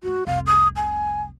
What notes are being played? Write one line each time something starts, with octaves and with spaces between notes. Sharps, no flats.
G2 G#3 F#4
F1 C2 F5
D#6
G#5